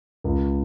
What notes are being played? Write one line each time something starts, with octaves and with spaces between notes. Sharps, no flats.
C#2